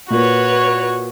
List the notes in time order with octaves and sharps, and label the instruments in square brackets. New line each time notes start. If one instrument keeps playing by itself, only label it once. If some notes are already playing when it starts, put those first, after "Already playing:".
[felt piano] A#2 A#3 [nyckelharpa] F#4 [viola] B4 C#5